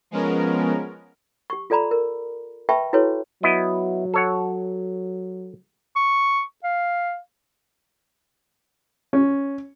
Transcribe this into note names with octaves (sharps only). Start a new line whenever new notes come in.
F3 G#3 B3 C#4 A#4
G4 C#6
F4 A4 D5 A#5 B5
A#4
B4 E5 G5 A5 B5 C#6
E4 F#4 A4 B4 C#5
F#3 B3 E4 D#5
A4 C#5 F#5
C#6
F5
C#4